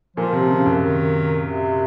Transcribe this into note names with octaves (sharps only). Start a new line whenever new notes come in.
A#2 F3
C3
C#3
F#2
D#3
C3